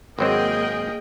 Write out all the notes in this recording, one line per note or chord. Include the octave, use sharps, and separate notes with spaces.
G#1 F#3 A#3 C4 G#4 D#5 G5